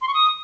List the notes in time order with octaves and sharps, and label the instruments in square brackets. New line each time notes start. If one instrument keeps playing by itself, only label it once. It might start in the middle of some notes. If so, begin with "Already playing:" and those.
[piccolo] C6
C#6
D#6